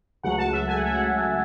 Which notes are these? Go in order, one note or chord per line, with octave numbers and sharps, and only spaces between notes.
C#2 C#3 F#3 A3 F#5
A5
E5
G#5
F#5
E5
F#5